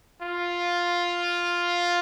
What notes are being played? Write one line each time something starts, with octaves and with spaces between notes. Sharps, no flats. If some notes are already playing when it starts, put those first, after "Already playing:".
F4